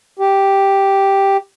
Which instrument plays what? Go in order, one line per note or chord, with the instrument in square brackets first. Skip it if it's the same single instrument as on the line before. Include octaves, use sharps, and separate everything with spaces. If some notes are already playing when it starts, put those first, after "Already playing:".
[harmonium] G4